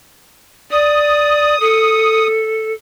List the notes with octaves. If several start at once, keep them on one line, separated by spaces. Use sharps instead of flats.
D5 D#6
A4